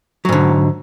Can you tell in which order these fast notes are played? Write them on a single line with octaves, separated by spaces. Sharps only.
F#3 G#2 D3